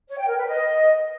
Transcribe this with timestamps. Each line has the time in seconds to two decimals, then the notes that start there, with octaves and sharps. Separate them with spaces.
0.09 C#5
0.18 G5
0.28 A#4
0.37 B4
0.47 D#5